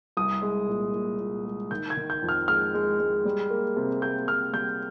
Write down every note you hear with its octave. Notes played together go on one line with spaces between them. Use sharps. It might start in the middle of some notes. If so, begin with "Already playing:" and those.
C2 D#6
G#3
A#2
A#2
A#2
G#3
D#3 G6
G#6
D#3
G6
F2
F6
G#3 F6
G#3
G#3
G3
A#3
C3
A#3 G6
C3 F6
G3 G6